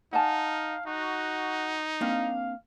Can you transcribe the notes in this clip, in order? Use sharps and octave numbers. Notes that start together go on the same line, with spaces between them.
D#4 F5 F#5 G#5 A5
D#4 F#4
A#3 C4 D4 F5